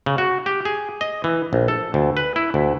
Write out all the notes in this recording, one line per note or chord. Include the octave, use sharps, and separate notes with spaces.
C#3
F#4
G4
G#4
D#5
E3
A#1
A4
D2
B4
E4
D2